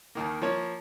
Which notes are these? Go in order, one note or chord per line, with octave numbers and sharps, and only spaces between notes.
D#2 D#3 A#3
F3 A#3 C#4 C#5